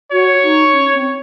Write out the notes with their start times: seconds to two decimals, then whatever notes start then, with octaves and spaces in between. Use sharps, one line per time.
0.12 F#4 C#5
0.42 D#4
0.73 C#4
0.93 C4